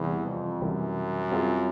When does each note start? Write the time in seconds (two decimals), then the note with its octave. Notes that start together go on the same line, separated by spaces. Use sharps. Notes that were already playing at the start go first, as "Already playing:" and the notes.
Already playing: E2 C3 E3 G3
0.26 F2
0.61 F#2 C3 E3 G3
1.31 G3 C4 F4 G#4